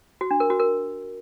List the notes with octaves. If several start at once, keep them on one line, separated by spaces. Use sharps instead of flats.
F#4
D4
A#4
F#4
A#4